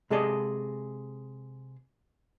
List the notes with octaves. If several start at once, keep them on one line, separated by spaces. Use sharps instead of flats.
C3 G#3 G#4 A4 D5 D#5